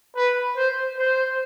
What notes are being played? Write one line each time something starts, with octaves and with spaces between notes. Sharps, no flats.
B4
C5
C5